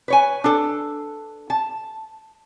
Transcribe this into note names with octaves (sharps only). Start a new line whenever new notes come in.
B4 C#5 G#5
D4 A4
A5